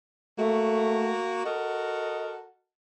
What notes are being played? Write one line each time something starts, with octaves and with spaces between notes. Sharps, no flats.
A3 A#3 F#4
F#4 A4 A#4 D#5